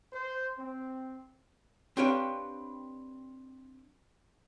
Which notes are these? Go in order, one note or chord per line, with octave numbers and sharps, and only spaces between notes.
C5
C4
C4 D4 G4 B4 C#5 F5